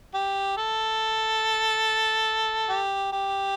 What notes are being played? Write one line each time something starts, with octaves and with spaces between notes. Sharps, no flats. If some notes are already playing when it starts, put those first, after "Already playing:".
G4
A4
G4
G4